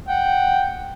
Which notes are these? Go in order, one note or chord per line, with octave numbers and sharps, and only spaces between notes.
F#5 G5